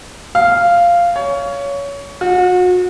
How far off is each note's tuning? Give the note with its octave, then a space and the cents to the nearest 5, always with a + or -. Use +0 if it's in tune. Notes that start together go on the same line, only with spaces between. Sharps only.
F5 -10
C#5 +20
F#4 -35